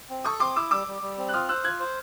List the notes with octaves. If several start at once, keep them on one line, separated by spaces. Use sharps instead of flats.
C4
A4 C#6 D#6
C4 C6 D6
E4 D6 E6
G3 D6 E6
G3
G3
C4
F#6
F4 D#6 F6
C5 E6 F#6
F4 F#6 G#6
C5